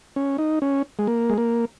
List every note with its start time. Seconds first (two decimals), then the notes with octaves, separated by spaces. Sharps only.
0.16 C#4
0.38 D#4
0.62 C#4
0.99 G#3
1.07 A#3
1.30 G#3
1.38 A#3